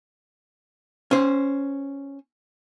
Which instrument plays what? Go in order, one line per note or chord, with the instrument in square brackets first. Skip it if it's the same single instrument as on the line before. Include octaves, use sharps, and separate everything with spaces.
[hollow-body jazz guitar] C#4 C5